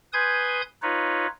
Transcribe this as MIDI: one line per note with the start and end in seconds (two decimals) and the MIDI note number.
0.13 0.62 71
0.13 0.62 80
0.13 0.62 84
0.13 0.62 87
0.13 0.62 91
0.13 0.62 92
0.82 1.27 63
0.82 1.27 65
0.82 1.27 71
0.82 1.27 73